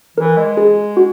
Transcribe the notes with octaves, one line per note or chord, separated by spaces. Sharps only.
E3 A#4
G#3
G#4
F#4